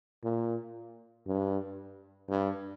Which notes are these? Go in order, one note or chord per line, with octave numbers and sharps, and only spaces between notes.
A#2
G2
G2